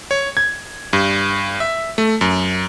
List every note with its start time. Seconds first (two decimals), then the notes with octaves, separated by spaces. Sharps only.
0.11 C#5
0.37 G#6
0.93 G2
1.60 E5
1.98 A3
2.21 F#2